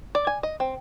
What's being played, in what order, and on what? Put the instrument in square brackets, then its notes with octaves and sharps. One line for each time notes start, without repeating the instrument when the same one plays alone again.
[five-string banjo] D5
G#5
D#5
C4